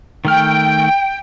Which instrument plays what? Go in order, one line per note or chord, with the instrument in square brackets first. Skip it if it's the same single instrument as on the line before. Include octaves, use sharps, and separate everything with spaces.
[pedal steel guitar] D#3 A3 F6 [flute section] G5